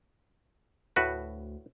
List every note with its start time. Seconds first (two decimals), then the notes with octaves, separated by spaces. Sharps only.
0.96 D2 A2 F#4 B4